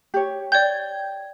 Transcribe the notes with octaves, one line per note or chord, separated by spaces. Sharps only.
G4 C#5
D5 G5 G6 G#6